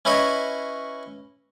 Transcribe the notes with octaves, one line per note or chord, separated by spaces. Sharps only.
C#4 E4 B4 C#5 D#5